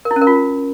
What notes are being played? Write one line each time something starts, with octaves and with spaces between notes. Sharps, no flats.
A#4
E4
C#4
A#4
F4